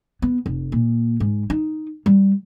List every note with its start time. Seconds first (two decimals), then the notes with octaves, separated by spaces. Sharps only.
0.22 B3
0.46 F1
0.72 A#2
1.20 G#2
1.50 D#4
2.06 G3